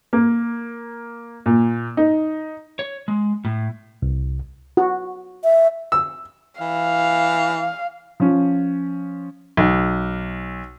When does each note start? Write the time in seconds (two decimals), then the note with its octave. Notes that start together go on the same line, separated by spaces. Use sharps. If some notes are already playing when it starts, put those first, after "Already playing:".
0.13 A#3
1.46 A#2
1.97 D#4
2.79 C#5
3.08 G#3
3.45 A2
4.02 C2
4.77 F#4
5.44 E5
5.92 E6
6.61 E3 F5
8.20 F3 C#4
9.57 B1